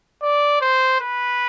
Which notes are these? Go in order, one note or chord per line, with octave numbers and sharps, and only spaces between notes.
D5
C5
B4